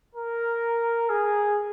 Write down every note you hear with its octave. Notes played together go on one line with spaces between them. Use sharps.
A#4
G#4